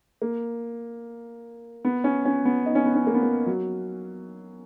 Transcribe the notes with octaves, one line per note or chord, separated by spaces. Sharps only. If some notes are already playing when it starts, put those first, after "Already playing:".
A#3
B3
C#4
C#4
B3
D#4
C#4
B3
C#4
A#3
B3
A#3
F#3